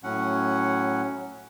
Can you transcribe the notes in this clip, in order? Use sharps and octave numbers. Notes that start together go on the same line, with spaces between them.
A2 F#3 C#4 F#5